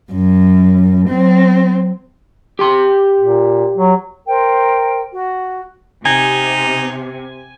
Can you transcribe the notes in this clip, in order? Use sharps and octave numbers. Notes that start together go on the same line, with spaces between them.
F#2
F#3 C4
G4 G5 C6
A#2
F#3
A#4 C5 G5
F#4
C3 D#4 G#5